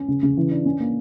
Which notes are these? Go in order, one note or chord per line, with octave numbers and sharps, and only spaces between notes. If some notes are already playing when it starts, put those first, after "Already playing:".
Already playing: C#4
C#3
C#3
E3
D4
C#4
A#3